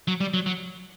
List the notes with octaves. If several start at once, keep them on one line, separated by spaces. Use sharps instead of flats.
F#3
G3
F#3
F#3